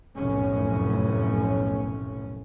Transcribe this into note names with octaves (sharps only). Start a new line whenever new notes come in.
F1 B1 F#2 A2 C#4